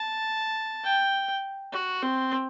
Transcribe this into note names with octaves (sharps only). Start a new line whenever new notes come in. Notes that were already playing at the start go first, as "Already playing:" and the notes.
Already playing: A5
G5
F#4
C4